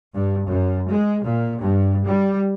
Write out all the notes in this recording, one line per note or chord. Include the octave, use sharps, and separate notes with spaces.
G2
F#2
G#3
A#2
G2
G3